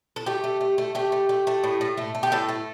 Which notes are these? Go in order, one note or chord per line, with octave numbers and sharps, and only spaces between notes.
A4
A3 G4
A3
A3
A3
A3 G4
A3
A3
A3
A2
A2
A3
A3
G4
A2 A4
A3